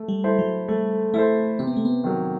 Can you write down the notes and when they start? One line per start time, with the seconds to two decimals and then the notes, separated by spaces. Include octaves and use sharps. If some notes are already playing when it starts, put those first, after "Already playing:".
Already playing: A3
0.09 G3
0.24 E4 A4 C5
0.39 F#3
0.68 G3 A3
1.14 A3 E4 A4 C5
1.59 C3 C4
1.67 B3
1.77 A3
1.85 B3
2.04 D#3 F#3